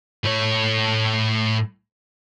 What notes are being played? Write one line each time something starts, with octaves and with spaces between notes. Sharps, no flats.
A2 C#5